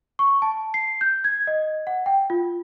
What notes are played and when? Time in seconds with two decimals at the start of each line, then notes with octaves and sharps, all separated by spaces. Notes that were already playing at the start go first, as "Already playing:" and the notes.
0.19 C#6
0.42 A5
0.74 C7
1.01 G6
1.24 G#6
1.47 D#5
1.87 F#5
2.06 G5
2.30 F4